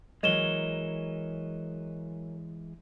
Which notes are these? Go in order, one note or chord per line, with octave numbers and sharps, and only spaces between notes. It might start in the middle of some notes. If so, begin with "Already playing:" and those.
E3 F#3 G#3 A#4 C#5 D#5 E7 G7